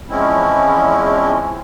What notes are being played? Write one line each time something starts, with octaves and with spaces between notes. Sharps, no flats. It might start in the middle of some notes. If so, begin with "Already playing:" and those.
E2 F3 G#3 C4 C#4 E4